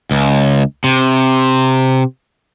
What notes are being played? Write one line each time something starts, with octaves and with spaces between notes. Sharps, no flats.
C#2
C3